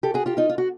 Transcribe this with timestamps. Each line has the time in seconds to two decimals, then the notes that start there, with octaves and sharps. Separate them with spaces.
0.03 G4 A4
0.14 F#4 G#4
0.26 F4 G4
0.37 D#4 F4
0.49 F4
0.58 F#4